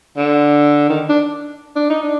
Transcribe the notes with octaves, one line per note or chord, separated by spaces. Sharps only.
D3
D#3
D4
D4
D#4
D4